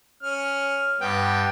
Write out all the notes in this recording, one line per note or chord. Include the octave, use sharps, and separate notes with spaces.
C#4 F6
G2 B3 G5